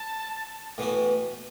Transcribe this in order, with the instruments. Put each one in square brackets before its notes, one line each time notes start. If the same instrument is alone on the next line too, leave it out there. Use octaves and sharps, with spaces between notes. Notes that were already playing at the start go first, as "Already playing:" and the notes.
Already playing: [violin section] A5
[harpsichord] A2 E3 B3 F#4